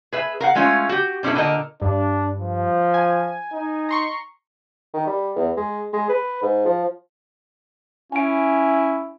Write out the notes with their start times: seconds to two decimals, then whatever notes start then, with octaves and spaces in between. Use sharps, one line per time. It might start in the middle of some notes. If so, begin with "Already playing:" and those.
0.13 G#4 B4 E5
0.40 A#4 F5 F#5
0.55 G#3 A3 C#4 F4 C#5
0.89 F#4 G4
1.23 B2 C#4 D4 E4 A4
1.35 A#2 D3 A4 A#4 D#5
1.82 G2 D4
2.40 F3
2.94 G#5
3.53 D#4
3.89 A#5 C6 C#6
4.94 D#3
5.07 G3
5.36 E2
5.57 G#3
5.93 G#3
6.09 B4
6.42 G#2
6.65 F3
8.12 C#4 E4 G#5 D7